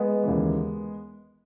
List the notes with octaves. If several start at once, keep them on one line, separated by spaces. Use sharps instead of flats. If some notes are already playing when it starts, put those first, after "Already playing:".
Already playing: G#3 B3
D#2 C#3 E3